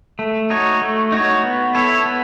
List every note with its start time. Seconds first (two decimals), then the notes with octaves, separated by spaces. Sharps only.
0.19 A3
0.50 D#4 F#4 C#5
0.82 A3
1.12 D#4 F#4 C#5
1.44 B3
1.75 E4 A4 C#5
2.06 B3